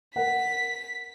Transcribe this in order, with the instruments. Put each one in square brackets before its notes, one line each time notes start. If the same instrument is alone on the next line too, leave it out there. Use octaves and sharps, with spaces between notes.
[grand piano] A#4 F#5 [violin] B6